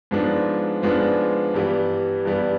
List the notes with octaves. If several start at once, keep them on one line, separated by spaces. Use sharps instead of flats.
G#2 F3 G#3 B3 D4
G#2 F3 G#3 B3 D4
G2 E3 G3 B3
G2 E3 G3 B3